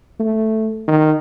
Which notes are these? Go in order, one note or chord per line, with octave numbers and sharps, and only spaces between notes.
A3
D#3